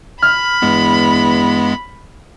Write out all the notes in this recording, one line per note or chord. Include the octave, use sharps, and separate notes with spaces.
B5 F6
E2 G2 G#3 B3